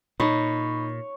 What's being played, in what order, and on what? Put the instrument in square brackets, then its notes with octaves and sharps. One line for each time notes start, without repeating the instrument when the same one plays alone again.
[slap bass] A#2 [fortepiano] D#4 [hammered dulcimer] C#5 [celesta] B5